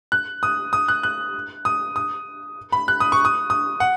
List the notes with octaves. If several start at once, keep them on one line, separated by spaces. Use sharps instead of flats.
F#6
D#6
D#6
F#6
F#6
D#6
D#6
B5
F#6
D#6
C#6
D#6
D#6
F#5